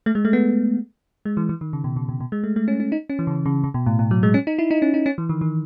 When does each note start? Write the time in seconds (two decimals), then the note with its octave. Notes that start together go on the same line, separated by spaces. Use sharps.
0.06 A3
0.15 G#3
0.25 A3
0.33 B3
1.25 G#3
1.37 E3
1.49 E3
1.61 D#3
1.73 C#3
1.84 B2
1.96 C#3
2.09 B2
2.21 B2
2.32 G#3
2.44 A3
2.56 A3
2.68 C#4
2.80 C#4
2.92 D#4
3.10 C#4
3.19 E3
3.27 C#3
3.46 C#3
3.64 C#3
3.74 B2
3.86 A2
3.99 A2
4.11 F#3
4.23 G#3
4.34 C#4
4.47 D#4
4.59 E4
4.71 D#4
4.82 C#4
4.94 D#4
5.06 C#4
5.18 E3
5.29 D#3
5.41 D#3